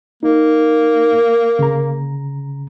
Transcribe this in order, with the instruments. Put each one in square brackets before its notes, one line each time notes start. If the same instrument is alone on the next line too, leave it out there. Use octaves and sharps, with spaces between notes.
[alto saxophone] A#3 [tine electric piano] D#4
[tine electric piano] C#3 A#5